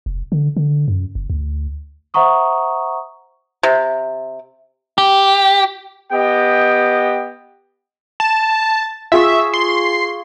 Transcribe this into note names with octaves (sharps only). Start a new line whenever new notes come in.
F1
D3
D3
F#2
F#1
D2
C5 E5 F#5 A#5 C#6 D#6
C3
G4
B3 G4 D#5 G5
A5
F4 G#4 E5 C#6
C6